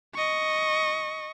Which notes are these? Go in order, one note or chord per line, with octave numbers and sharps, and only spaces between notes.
D#5 C#6